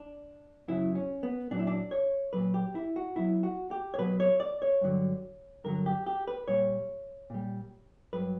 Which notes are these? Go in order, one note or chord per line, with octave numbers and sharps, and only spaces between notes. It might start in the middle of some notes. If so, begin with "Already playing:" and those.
Already playing: D4
F#2 C#3 F#3 E4
C#4
B3
A#2 F#3 D4
E4
D4
C#5
A#2 F#3 B4
G4
E4
F#4
B2 F#3 E4
F#4
G4
C#5
B2 F#3 B4
C#5
D5
C#5
G2 D3 F#3
G2 D3 F#3 A#4
G4
G4
B4
A#2 G3 C#5
A#2 G3
G2 F#3 B4